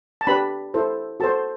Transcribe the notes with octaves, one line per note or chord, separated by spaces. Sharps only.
A5
D4 G4 B4 B5
E4 A4 C5
F#4 A4 C5 A5